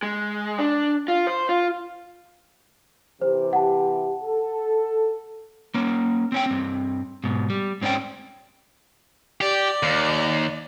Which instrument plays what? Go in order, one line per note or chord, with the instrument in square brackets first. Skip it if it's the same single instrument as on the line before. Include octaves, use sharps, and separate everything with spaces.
[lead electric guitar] G#3
D4
F4
C5
F4
[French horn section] C3 E3 G4 [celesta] C5
[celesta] F#5 A5
[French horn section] A4
[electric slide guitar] A#3 C#4
C4 C#4 G5
G2 C4
G#2 B2
G3
G#2 C4 C#4 D5 G5
[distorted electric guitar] G4 [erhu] D5
[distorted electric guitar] D#2